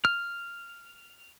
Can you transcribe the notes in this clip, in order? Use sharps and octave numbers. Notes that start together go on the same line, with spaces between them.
F6